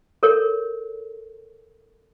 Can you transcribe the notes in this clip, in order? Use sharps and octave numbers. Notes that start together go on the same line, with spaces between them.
A4 A#4 C#5